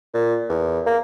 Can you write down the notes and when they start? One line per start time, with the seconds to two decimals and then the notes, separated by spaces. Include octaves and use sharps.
0.14 A#2
0.49 E2
0.86 A#3